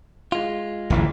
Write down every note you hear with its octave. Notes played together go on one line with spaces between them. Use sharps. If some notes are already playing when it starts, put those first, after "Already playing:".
G#3 F4
D1 A1 E3